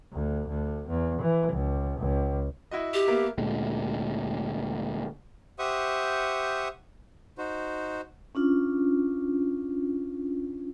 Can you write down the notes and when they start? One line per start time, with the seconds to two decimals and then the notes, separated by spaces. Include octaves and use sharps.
0.13 D2
0.48 D2
0.88 E2
1.22 E3
1.53 C#2
2.00 C#2
2.71 E4 F#4 D#5
2.94 G4
3.08 A#3 B3 E5
3.38 D2 A#2 G#3
5.59 G4 C5 E5 F#5 C#6 D#6
7.38 D#4 F#4 C5
8.35 C#4 D4 F4